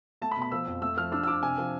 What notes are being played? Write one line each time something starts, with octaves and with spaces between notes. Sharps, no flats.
A3 A5
B5
B2
B5
F3 E6
F2
A3 E6
F3 F6
D4 E6
E6
D4 D6
C3 G#5
F3